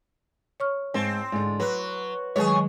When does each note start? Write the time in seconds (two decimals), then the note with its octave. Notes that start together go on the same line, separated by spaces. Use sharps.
0.60 C#5 C#6 F6
0.94 G#2 C4 C5 A5
1.32 G#2 D3
1.60 F#3 B4
2.36 D#3 F#3 G#3 G#4 B4 C#5